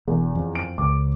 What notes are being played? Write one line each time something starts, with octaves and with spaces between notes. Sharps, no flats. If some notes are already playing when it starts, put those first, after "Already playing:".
E1 E2
F2
D7
C#2 D6